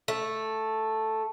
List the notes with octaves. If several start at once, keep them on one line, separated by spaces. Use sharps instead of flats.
A3